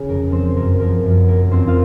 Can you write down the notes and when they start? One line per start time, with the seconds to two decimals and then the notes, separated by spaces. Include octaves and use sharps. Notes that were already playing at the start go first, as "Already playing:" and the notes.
Already playing: C#3 G#4
0.08 F2 A#4
0.32 F3 C4 C5
0.56 F#2 A#4
0.80 F3 A#4
1.04 F#2
1.28 A#3 A#4
1.52 F2 C4 C5
1.67 F4 F5